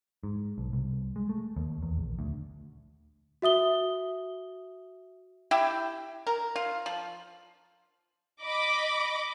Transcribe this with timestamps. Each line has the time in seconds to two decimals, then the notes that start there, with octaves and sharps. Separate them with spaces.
0.23 G#2
0.58 B1
0.73 C2
1.16 G#3
1.29 A3
1.57 D#2
1.83 E2
1.97 A#1
2.19 D2
3.42 F#4 E5 D#6 G7
5.51 E4 G4 E5 G5
6.27 A#4
6.56 F4
6.86 F3
8.42 D#5 B5 D6